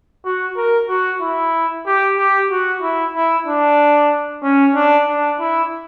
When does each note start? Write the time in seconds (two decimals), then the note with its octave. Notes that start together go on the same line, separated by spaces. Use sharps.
0.25 F#4
0.57 A#4
0.89 F#4
1.21 E4
1.86 G4
2.18 G4
2.51 F#4
2.82 E4
3.15 E4
3.46 D4
4.43 C#4
4.75 D4
5.08 D4
5.40 E4